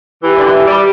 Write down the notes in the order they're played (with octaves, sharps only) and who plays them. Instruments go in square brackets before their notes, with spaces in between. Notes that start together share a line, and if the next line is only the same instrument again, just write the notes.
[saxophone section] E3 [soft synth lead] G4
[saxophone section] D3
E3
G3